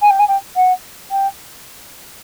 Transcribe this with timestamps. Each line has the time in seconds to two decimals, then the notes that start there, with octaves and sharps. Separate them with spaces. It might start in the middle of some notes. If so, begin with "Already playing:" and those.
0.01 G#5
0.10 G5
0.19 G#5
0.28 G5
0.56 F#5
1.11 G5